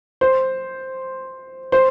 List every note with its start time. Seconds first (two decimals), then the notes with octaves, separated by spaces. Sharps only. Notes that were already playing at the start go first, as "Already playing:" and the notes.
0.21 C5
1.72 C5